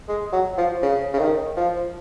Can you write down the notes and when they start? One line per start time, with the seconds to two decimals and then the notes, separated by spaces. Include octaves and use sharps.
0.09 G#3
0.32 F#3
0.58 F3
0.82 C#3
1.13 C#3
1.19 D#3
1.57 F3